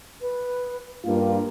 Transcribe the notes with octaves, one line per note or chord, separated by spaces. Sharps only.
B4
G2 A#3 F4